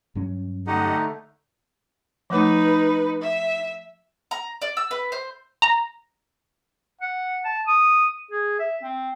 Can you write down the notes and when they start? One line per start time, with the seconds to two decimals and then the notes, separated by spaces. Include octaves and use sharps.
0.15 G2 F#3 C#4
0.67 D3 A3 D#4 G4 D#5 F#5
2.30 F3 A3 D#4 B4
3.22 E5
4.31 A#5
4.62 D5
4.77 E6
4.91 B4
5.12 C5
5.62 A#5
7.01 F#5
7.45 A5
7.67 D#6
8.31 G#4
8.59 E5
8.83 C4